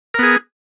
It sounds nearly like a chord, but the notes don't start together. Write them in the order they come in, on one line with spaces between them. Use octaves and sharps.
A#4 B3 G#4